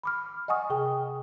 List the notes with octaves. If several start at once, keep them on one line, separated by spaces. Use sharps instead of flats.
B5 D6 F6
D#5 F#5 G#5 C#6 D#6
C3 G#4 G5